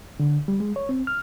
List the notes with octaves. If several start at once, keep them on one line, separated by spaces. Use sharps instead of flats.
D3
G3
G#3
C#5
C4
F6